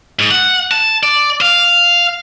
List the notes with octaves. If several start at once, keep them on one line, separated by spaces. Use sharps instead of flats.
G#2
F#5
A5
D5
F5